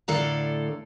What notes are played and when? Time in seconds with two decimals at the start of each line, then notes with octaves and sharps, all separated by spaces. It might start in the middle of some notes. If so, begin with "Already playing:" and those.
0.08 A2 D3 A4 D5 F5 A#5